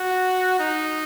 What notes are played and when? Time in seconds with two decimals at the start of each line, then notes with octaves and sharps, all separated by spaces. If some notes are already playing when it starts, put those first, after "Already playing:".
Already playing: F#4
0.60 D#4